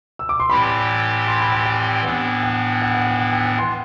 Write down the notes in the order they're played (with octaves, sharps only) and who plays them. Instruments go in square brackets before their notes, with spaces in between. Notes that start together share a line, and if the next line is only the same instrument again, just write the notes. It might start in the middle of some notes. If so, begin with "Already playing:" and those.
[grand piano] E6
D6
C6
[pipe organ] A2 E3 G3 C4 G4 [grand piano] B5
[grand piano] C6
B5
G5
G5
[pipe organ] A2 E3 B3 D4 [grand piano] F#5
[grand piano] G5
F#5
F#5
G5
F#5
G5
G5
C6